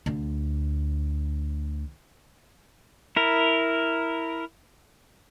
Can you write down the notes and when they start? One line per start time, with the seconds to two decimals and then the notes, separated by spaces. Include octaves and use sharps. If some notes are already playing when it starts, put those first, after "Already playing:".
0.06 D2 D3
3.16 E4 A#4